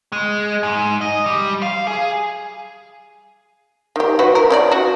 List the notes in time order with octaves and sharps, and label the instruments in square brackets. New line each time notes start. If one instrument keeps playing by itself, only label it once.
[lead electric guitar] G#3
G#2
D#5
G3
F5
G#4
[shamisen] D#3 G4
F#3 F#4 B4
A#4
C#4 A#4 D5
F#4